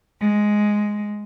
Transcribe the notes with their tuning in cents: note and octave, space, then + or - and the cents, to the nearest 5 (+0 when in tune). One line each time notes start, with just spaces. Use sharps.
G#3 +5